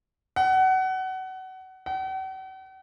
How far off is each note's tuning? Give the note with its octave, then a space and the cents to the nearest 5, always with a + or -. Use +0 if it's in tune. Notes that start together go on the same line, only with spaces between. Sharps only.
F#5 +25
F#5 +45